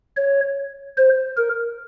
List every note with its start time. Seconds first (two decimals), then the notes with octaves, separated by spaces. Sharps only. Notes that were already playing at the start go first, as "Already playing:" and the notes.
0.17 C#5
0.97 C5
1.37 A#4